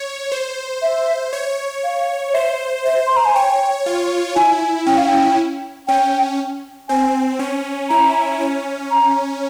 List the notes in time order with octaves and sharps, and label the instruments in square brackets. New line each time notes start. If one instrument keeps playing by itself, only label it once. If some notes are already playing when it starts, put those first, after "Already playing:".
Already playing: [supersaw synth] C#5
C5
[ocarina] E5
[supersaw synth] C#5
[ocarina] F5
C#5
[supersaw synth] C5 [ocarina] E5
[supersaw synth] C5 [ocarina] E5
[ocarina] C6
A#5
G#5
[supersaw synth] C#5 [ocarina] G5
[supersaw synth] F4
[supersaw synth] E4 [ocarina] G#5
[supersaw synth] C#4 [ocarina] G5
[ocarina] F5
G5
[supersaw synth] C#4 [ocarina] G5
[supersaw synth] C4 [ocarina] G#5
[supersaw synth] C#4
[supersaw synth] E4 [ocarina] A#5
[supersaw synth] C#4
[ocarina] A#5